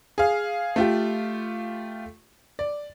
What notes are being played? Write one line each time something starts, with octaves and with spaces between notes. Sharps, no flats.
G#4 F5
A3 F4 G4
D5